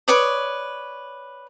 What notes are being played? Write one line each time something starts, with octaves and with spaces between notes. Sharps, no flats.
B4 C#5 D5 D#6